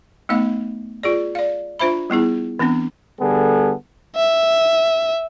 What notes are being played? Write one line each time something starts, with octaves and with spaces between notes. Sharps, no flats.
A3 B3 D#4 F5
F4 G#4 D5
D5 F5
D4 F4 C5 E5 B5
G3 B3 E4 G#4
E3 B3 C4 D4
D3 G3 B3 G#4 A4
E5